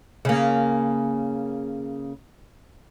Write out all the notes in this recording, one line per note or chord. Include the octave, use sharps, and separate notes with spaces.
C#3 A#3